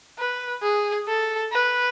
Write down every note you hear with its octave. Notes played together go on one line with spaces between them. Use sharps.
B4
G#4
A4
B4